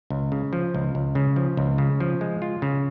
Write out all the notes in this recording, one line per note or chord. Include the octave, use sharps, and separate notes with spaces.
C#2
C#3
F3
C#2
C#2
C#3
F3
C#2
C#3
F3
G#3
F4
C#3